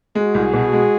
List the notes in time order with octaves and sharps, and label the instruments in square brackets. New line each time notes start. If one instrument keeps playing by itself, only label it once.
[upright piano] G#3 [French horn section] F#4 G#4
[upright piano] C2
B2
G#3